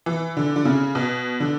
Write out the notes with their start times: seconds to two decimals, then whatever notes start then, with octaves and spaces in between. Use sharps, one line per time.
0.06 E3
0.37 D3
0.56 D3
0.65 C#3
0.95 B2
1.40 D3